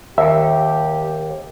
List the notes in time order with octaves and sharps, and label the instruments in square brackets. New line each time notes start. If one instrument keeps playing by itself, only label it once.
[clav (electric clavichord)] D#2 [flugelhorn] G4 [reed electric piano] E5